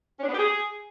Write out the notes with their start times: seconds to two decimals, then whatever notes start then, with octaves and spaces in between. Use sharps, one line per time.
0.19 C#4
0.24 D4
0.29 B3
0.34 G4
0.39 G#4